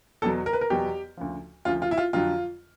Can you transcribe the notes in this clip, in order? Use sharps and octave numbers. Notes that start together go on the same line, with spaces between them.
E2 B2 F#3 A4
A#4
B4
A#4
E2 B2 F#3 G4
D2 C#3 F3
D2 C#3 F3 F4
F4
E4
F4
F2 D3 F#3 F4